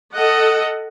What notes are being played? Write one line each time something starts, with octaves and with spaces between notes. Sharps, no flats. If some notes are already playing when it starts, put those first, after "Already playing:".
A4 D#5 F#5